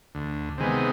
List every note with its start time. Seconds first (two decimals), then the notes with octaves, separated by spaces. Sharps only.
0.15 D2
0.58 C3 D#3 G#3 B3